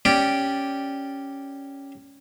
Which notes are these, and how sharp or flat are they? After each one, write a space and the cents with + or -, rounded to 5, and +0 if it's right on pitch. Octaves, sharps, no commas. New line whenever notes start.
C#4 +0 G4 +0 D5 +0